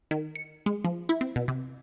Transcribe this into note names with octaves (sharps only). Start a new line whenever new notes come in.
D#3
C#7
G#3
F3
E4
C4
B2
C3